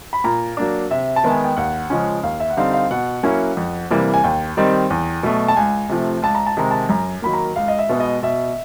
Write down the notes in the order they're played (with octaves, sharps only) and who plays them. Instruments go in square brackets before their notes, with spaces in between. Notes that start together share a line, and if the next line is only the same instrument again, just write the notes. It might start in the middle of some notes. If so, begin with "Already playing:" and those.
[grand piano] B5
A#2 A#5
F#3 A#3 D4
C3 E5
A5
D#3 G#3 B3
G#5
G5
D#2 F#5
C#3 F3 G#3 C#4
D#2 F5
E5
F#5
D3 G3 C4 D#4 F5
F5
B2 F#5
F#3 A#3 C#4 E4
F2
C3 E3 G3 A#3
G#5
D#2 G5
D#3 G3 C4 D#4
E2
B2 F#3 A3
A5
C#2 G#5
C3 F3 A3
C#2 A5
A#5
A5
C3 D#3 G#3 A#5
A5
F#2 A#5
D#3 F#3 A#3 B5
A#5
C#2 F5
D#5
E5
B2 G#3 B3
D#5
B2 E5